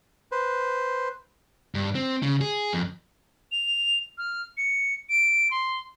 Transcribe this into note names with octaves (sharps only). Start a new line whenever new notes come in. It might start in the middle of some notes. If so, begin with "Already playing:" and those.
B4 C5
G2
C4
C#3
G#4
F2
F7
F6
C#7
D7
C6